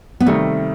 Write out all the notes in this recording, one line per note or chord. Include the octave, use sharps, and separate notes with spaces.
B3
C3 D#3 G3 A3